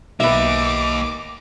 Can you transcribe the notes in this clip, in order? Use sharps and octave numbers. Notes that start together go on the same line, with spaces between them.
B1 A#3 D#4 B4 E5 D6